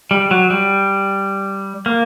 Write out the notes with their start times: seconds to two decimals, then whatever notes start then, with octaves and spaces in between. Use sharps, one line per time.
0.11 G3
0.31 F#3
0.50 G3
1.86 A#3